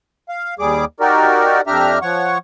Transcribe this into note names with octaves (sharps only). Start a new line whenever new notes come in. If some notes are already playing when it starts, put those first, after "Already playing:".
F5
D#2 G3 G#4 D6
D#4 F#4 G4 A#4 D5
F2 D4 G4 E5 A#5 F6
F3 C#5 F#5 C#6